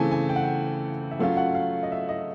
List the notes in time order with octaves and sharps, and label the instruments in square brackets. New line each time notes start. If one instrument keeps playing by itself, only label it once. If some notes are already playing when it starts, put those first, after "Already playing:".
Already playing: [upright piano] C#3 E3 A3 C4 G#5 A5
G#5
G5
F#5
G5
E5
F#3 A3 C#4 F4 F5
F#5
F5
D#5
E5
D#5